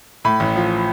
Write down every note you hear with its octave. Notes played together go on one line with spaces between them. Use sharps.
A2 B5
A1
F3